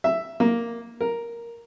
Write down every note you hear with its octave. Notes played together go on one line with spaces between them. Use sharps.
E5
A#3
A#4